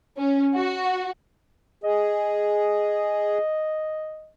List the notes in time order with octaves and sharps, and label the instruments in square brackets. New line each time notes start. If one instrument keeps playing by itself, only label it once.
[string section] C#4
F#4
[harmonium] G#4 [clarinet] D#5